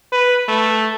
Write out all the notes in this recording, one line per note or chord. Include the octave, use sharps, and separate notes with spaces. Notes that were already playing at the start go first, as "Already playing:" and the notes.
B4
A3